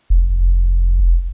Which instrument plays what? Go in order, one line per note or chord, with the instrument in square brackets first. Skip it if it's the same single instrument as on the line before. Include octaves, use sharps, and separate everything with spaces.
[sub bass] F1